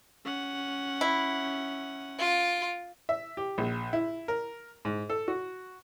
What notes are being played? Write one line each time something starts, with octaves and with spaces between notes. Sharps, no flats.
C#4 F#5
E4
F4 D7
E5
G4
A#1
E4
A#4
G#2
A4
F#4